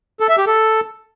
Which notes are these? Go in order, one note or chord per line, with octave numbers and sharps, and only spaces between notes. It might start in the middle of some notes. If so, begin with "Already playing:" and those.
A4
E5
G4
A4